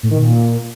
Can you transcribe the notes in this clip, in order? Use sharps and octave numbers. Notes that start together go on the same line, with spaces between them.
A2
D#3
A#2